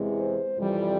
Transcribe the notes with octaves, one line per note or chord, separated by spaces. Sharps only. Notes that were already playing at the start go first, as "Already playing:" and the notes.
Already playing: E2 C3 E3 G#3
C5
F2 C3 E3 G3